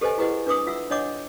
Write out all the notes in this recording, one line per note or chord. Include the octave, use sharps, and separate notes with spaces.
G4 A4 B4 C5 D#5 G#5
E4 G4 G#4 B4 D#5 F#5
D4 B4 D6 D#6
F4 E5 F#5 E6
D4 C#5 D#5 F#5 D6